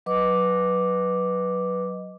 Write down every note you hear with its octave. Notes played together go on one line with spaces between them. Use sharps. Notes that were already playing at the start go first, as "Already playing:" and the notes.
F#3 B4 D#5 D6